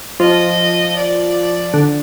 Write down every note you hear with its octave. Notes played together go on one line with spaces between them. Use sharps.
F3 D#5
D5
D3